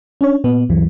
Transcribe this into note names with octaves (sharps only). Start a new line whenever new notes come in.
C#4 D4 C#5
A#2 B3
D2 G2 E3 F#3